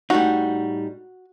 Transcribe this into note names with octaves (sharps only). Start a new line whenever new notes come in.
A2 G3 D#4 F#4